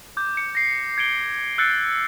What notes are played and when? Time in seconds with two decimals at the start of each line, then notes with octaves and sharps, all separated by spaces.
0.17 D6 G6
0.37 G6 C#7
0.55 A#6 C7
0.98 G#6 C#7 D7 G7
1.13 C#7
1.58 E6 F#6 G6 A6 C7 C#7